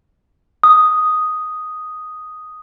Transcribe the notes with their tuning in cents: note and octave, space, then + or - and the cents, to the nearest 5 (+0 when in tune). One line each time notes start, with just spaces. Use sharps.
D#6 +0